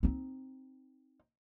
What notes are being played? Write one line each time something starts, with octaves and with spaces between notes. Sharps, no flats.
C4 D#4